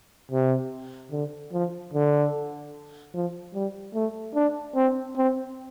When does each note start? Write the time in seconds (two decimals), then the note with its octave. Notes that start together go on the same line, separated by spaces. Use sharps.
0.31 C3
1.11 D3
1.52 F3
1.93 D3
3.14 F3
3.54 G3
3.94 A3
4.35 D4
4.75 C4
5.16 C4